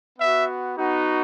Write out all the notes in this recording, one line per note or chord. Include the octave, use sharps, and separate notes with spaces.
B3 F#4 E5
B3 D#4 F#4